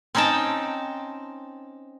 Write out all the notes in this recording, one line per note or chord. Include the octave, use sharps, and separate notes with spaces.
C4 C#4 D#4 G5 A5